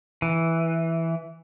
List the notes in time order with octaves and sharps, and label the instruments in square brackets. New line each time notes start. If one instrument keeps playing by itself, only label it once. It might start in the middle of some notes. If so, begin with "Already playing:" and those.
[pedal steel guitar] E3